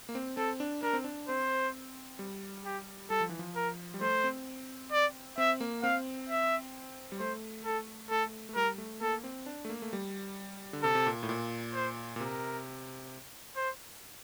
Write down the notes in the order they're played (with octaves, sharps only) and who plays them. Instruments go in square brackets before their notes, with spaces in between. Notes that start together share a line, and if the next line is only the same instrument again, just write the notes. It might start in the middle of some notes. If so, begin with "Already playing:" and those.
[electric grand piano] A#3
C4
[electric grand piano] C4 [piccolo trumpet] A4
[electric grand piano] D4
[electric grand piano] D4 [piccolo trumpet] A#4
[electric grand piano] C4
D4
[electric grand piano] C4 [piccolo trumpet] C5
[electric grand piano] G3
[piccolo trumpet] G4
[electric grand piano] G3 [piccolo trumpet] A4
[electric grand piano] F3
E3
F3
[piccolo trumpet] A#4
[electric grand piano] G3
[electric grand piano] A3 [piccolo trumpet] C5
[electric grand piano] C4
[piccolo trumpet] D5
[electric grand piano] C4 [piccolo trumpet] E5
[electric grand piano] A#3
[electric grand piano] C4 [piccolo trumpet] F5
[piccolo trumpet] E5
[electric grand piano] G3
[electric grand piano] A3 [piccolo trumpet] C5
[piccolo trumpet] A4
[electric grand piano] A3 [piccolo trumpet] A4
[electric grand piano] A3
[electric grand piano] G3 [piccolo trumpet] A#4
[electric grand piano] A3
[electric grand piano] A#3 [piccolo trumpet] A4
[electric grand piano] C4
D4
A3
A#3
A3
G3
D3
[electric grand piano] C3 [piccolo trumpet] A4
[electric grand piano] C3
A#2
A2
A#2
[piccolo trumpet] C5
[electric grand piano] A#2
[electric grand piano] C3 [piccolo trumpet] A#4
[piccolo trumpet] C5